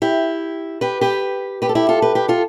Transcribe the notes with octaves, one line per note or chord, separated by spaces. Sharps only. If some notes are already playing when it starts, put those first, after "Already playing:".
E4 G4
G4 B4
G4 B4
G4 B4
A4
E4 G4
F4 A4
G4 B4
G4 B4
F4 A4